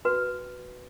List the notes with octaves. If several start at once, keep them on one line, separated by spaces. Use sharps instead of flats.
F#4 B4